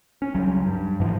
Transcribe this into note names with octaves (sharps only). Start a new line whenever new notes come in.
C#4
C#2 F#3 G3
G2
G#2 E3 F3